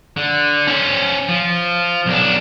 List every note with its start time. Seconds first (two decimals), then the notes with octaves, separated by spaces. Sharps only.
0.17 D3
0.67 C#4 C5
1.29 F3
2.06 B1 D4